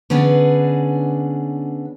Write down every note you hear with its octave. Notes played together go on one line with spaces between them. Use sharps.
D3 B3 C#4 D4 G#4 B4